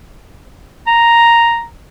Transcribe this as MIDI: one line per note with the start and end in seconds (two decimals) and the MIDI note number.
0.87 1.65 82